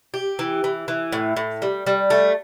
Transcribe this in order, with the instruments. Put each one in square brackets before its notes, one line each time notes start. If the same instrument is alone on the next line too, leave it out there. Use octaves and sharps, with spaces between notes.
[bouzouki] G4
E3
E3
E3
A2
A2
G3
G3
A3